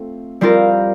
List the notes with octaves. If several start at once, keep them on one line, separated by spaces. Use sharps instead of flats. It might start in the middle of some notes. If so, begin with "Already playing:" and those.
Already playing: A3 C4 F4
G3 C4 F4 A#4